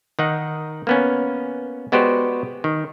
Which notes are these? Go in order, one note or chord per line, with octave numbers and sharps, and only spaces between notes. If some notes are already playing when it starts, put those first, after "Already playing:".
D#3 D#4 F#5
A#3 B3 C#4
G#3 B3 F#4 G4 C5 D5
D#3